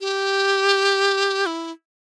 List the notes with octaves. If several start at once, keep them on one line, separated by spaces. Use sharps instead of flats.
G4
E4